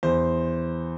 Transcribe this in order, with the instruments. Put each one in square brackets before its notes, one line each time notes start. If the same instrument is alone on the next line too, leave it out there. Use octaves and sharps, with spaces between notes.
[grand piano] E2 C5